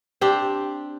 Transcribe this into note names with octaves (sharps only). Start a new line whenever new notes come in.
C4 D4 G4